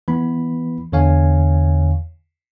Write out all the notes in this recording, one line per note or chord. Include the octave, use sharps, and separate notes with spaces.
E3 B3 B5
E2 D3 C#5 F5 G#5